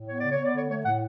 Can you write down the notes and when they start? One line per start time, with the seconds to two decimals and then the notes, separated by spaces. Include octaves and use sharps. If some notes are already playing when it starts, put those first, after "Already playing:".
Already playing: A2
0.08 B3 C#5
0.20 C#3 D5
0.32 C#5
0.39 B3
0.44 D5
0.54 D3 C#5
0.70 A3 C#5
0.86 A2 F#5